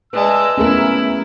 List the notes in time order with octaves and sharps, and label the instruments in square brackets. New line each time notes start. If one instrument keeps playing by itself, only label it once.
[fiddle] G#3 A5 [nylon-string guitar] B4 D5 E5 [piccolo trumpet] E6
[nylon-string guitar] F#3 A3 B3 [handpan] C#4 G#4 A#4 [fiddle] E4